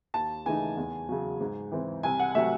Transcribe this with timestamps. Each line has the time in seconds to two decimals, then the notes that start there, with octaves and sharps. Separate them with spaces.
0.14 D#2 A5
0.45 C#3 E3 A3 D#4 G#5
0.77 E2
1.09 C#3 F#3
1.40 G#2
1.72 E3 C4
2.03 C2 G#5
2.20 F#5
2.35 C3 F#3 A3 E5